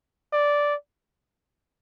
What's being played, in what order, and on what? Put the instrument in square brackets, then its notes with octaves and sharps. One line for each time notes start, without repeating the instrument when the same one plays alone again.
[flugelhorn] D5